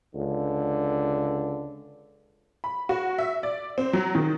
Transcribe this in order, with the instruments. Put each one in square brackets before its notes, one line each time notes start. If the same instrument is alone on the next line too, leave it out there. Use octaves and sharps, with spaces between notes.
[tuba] C#2 [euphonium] D3
[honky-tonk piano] B5
F#4
E5
D5
C4
F#3
D#3